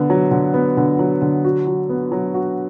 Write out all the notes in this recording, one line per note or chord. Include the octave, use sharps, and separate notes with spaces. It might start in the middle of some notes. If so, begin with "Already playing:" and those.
Already playing: D3 B3
F#3
D3
B3
D3
F#3
D3
F#4
F#3
B3
F#3
F#4